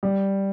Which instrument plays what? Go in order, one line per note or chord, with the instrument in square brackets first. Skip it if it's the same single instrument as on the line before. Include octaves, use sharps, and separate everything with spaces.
[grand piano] G3